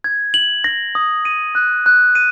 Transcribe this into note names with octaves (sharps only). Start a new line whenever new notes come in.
G#6
F#7
A#6
D#6
D#7
F#6
F#6
D#7